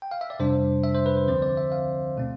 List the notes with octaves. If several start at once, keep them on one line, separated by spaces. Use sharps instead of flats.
G5
F5
E5
D5
F2 C3 G3 D4 C5
E5
C5
B4
C5
D2 D3 F3 C4 C5
D5
E5
F5
B2 A3 C4